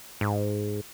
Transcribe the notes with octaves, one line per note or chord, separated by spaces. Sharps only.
G#2